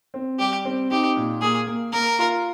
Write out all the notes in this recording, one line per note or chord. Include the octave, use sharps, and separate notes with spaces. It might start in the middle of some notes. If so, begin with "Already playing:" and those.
C4
G3 G4
C4
D#4 G4
A#2
A#3 G#4
A#3
A#3 A#4
F4